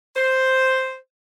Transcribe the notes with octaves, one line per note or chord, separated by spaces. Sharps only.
C5